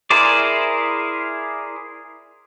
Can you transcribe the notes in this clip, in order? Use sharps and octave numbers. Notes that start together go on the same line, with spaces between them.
E4 G#4 A#4 C5 D5